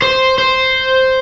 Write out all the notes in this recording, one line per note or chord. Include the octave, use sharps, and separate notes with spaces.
C5
C5